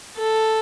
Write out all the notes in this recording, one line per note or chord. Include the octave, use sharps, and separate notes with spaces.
A4